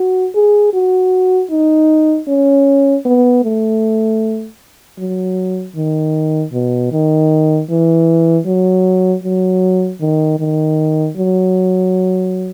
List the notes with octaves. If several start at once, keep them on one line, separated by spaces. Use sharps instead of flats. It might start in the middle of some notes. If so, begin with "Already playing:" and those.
Already playing: F#4
G#4
F#4
D#4
C#4
B3
A3
F#3
D#3
B2
D#3
E3
F#3
F#3
D#3
D#3
F#3